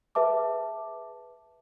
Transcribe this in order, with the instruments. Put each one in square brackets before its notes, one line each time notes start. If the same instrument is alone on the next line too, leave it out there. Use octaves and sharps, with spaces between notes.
[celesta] G#4 B4 E5 A5 D6